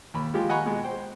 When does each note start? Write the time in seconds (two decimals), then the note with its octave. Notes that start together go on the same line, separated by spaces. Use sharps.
0.14 D#2 B5
0.34 F3 G#3 F4 G4
0.49 D#5 F#5 G#5 A#5 B5 C#6
0.65 B2 G#3
0.84 C5 G5